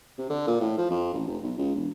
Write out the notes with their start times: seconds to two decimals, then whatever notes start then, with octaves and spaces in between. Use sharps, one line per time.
0.18 C3
0.30 D3
0.47 A#2
0.60 A2
0.77 F3
0.90 F2
1.14 A1
1.27 F1
1.43 B1
1.58 C#2
1.75 E1